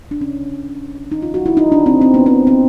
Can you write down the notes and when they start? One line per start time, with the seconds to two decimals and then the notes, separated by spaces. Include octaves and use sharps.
0.11 D4
0.21 C#4
1.12 D#4
1.22 F4
1.34 F#4
1.46 E4
1.57 D#4
1.72 D4
1.86 C4
2.01 C4
2.14 B3
2.26 C4
2.47 C4